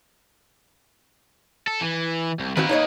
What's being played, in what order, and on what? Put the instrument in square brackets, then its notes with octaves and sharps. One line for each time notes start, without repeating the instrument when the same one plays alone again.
[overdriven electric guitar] A4
E3
C2
[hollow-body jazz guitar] D#3 C4 F#4 [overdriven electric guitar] A#3 B4
[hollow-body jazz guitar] D#4 C#5 D#5